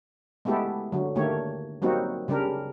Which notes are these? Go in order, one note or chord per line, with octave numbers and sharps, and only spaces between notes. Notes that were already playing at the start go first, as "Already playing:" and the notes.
G#3 A3 B3 E4 G4 A4
D3 F#3
D3 D#3 A3 A#3 G4 C#5
F#3 G3 A#3 C4 D#4 F#4
C#3 G3 D4 G4 A#4